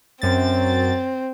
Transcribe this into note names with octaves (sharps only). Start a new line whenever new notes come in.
F#2 C4 A6